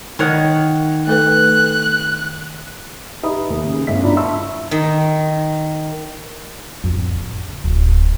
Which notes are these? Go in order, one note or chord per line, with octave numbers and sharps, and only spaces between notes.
D#3 C#5 F#5
A3 A4 B4 F#6
D#4 G4 B4 E5 B5 D#6
D#2
C#3 C#4 G#4
G1 A2 E5 B6
D4 E4 F4 D5 A#5 B5
E5 A5 C6 C#6 E6
D#3
F2 A2
D3
D1